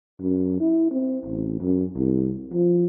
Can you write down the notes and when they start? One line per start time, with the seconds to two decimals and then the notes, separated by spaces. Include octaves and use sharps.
0.21 F#2
0.60 E4
0.91 C4
1.26 A1
1.60 F#2
1.96 C2
2.53 F3